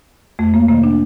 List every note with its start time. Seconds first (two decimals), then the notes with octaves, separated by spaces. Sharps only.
0.39 F2 A3
0.54 A#3
0.68 C3 D#3 A#3
0.84 D4